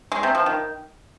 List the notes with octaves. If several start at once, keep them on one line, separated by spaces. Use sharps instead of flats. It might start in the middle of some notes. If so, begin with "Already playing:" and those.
G#3
C3
F3
D#3